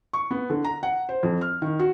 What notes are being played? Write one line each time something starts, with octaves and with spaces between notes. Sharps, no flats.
C#6
B3
D3
A#5
F#5
C5
F2
F6
D#3
F#4